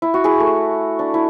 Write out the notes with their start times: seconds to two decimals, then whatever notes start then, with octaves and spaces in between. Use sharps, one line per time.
0.02 E4
0.14 F#4
0.24 E4 G#4
0.40 A3
0.99 D4
1.14 E4